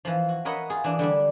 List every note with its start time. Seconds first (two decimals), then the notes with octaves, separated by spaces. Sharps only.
0.05 E3 F3
0.29 F#4
0.45 A#4 B4 C#5 D#5 E5 F#5
0.70 F4 G#4
0.84 E3 D4
0.99 D3 G3 D4